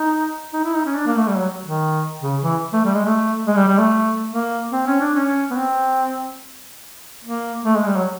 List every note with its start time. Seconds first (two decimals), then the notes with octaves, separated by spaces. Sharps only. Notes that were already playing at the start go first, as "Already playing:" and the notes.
Already playing: D#4
0.53 D#4
0.64 E4
0.74 D#4
0.85 C#4
0.95 D4
1.06 A#3
1.17 A3
1.27 G3
1.38 F#3
1.65 D#3
2.21 C#3
2.42 E3
2.73 A3
2.84 G3
2.94 G#3
3.05 A3
3.47 G#3
3.57 G3
3.68 G3
3.78 A3
4.31 A#3
4.72 C4
4.87 C#4
5.01 D4
5.15 C#4
5.50 B3
5.57 C4
7.24 A#3
7.65 A3
7.76 G#3
7.86 G3
7.96 F#3